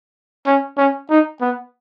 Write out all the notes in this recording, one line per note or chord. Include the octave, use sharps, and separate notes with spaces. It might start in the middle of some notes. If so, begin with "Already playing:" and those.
C#4
C#4
D#4
B3